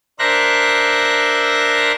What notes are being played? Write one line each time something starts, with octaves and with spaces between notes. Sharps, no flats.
D4 A#4 C5 E5 F#6 A#6